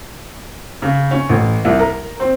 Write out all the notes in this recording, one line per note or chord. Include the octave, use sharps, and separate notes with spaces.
C#3
C#4
A1
C2
A#4
C4